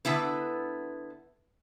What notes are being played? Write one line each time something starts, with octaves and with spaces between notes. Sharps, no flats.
D3 B3 E4 B4